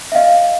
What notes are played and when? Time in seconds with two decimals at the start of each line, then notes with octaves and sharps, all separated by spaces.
0.12 E5
0.15 D#5 F5